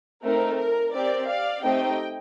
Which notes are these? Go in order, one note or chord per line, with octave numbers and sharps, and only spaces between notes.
A3 C4 D#4 A#4
A#4
C4 G4 A#4 D5
D5 F5
A3 C4 D#4 G4 D#5 G5